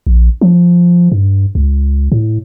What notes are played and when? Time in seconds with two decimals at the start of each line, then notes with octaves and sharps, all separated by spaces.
0.07 A#1
0.41 F3
1.12 G2
1.55 C#2
2.12 A2